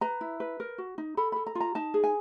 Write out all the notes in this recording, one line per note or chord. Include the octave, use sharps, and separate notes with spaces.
B4 A#5
E4
B4
A#4
F#4
D#4
A4 B5
A4 B5
A#5
F4
A#5
D#4 A5
G#4
G#5